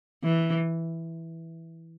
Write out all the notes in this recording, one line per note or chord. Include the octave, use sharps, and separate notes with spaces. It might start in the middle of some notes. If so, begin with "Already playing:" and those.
E3